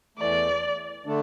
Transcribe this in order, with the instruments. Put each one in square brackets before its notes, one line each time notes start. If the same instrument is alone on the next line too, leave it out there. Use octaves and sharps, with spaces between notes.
[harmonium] E2 E3 A3 [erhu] D5
[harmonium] D3 A3 D4